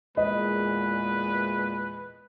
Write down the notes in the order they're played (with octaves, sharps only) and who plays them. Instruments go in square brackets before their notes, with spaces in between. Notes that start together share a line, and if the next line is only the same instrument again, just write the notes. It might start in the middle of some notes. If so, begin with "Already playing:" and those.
[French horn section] E2 A#2 G#3 [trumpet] B4 [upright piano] D#5